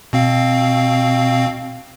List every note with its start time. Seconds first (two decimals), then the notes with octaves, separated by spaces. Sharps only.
0.13 B2 C4 F5